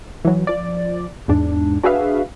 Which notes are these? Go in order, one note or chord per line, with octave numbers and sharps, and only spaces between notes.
E3 F#3
F3 D5
E2 G#2 D4
D4 F#4 G#4 B4 E5 F5